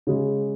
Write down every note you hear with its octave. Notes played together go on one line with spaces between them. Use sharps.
C#3 G#3